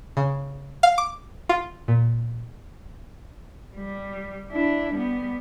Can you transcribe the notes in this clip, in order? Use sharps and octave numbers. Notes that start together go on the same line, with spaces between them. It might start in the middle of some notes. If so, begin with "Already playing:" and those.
C#3
F5
D6
F4
A#2
G3
D4 E4
G3 B3